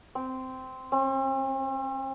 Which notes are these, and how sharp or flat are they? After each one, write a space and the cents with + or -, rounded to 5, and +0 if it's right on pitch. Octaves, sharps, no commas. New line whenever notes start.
C4 -10
C4 +45